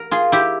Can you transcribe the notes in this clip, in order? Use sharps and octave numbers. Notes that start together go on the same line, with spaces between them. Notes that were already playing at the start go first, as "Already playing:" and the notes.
Already playing: A#4
F4 G#4
E4 G4